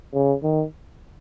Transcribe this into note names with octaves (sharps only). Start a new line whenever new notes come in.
C#3
D#3